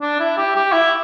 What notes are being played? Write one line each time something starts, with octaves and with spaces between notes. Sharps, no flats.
D4
E4
G4
G4
E4